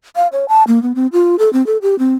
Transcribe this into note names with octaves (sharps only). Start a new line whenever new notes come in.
F5
C#5
A5
A#3
B3
C4
F4
A4
C4
A4
G4
C4